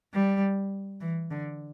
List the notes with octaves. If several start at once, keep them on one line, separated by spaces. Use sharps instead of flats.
G3
E3
D3